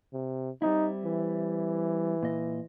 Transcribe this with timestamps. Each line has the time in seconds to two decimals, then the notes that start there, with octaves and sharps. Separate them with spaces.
0.13 C3
0.62 G3 C4 D#4 E4
1.05 E3
2.23 A#2 D#5